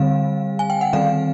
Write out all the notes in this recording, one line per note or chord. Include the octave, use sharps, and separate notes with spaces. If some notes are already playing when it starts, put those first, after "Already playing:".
Already playing: D3 G3 C4 F5
G#5
G5
F#5
D#3 G3 C4 F5